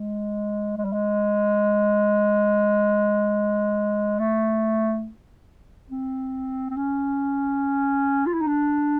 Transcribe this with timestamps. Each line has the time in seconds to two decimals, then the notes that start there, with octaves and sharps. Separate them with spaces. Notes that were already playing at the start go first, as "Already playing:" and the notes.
Already playing: G#3
0.77 G#3
0.85 G3
0.93 G#3
4.19 A3
5.91 C4
6.70 C4
6.77 C#4
8.26 F4
8.34 E4
8.41 D#4
8.47 D4